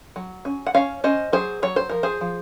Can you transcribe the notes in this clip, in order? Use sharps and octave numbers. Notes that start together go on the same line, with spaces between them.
F#3
C#4
F#5
C#4 C#5 F5
C#4 C5 D#5
F#3 G#4 C5
F#3 C#5
C5
F3 A#4
G#4 C5
F3